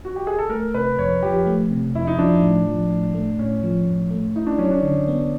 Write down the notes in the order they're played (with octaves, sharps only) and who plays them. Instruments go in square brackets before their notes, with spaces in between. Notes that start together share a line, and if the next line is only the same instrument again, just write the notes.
[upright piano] F#4
G4
G#4
A4
[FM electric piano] A3 [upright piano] A#4
[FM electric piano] C3 [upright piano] B4
[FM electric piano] F2 [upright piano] C#5
[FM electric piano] F3 [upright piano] G4
[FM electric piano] A3
C3
[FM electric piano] F2 [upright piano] E4
[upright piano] D#4
[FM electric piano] F3 [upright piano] D4
[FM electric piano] A2
F3
A2
A3
[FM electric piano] A2 [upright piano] C#4
[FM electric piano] F3
A2
A3
[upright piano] D#4 [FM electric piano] E4
[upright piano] D4
[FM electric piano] F#3 [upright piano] C#4
[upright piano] D4
[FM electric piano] D3
B3